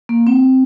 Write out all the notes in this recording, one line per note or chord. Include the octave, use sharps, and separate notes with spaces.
A#3
C4